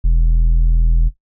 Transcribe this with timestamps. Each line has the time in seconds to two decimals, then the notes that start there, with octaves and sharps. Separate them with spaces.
0.04 E1